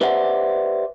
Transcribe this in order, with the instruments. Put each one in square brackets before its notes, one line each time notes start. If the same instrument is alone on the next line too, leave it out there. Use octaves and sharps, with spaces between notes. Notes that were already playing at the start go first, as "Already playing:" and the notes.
[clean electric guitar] G4 B4 C5 D5 E5 F#5